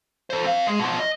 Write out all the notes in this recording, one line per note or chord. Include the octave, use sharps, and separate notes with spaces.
A4 C5
C4 F5
G#3 G#4
B2 F3
D#5